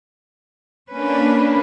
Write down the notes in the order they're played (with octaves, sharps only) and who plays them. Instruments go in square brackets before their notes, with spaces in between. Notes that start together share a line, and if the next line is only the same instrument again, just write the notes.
[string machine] A#3 D4 [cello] C#4 B4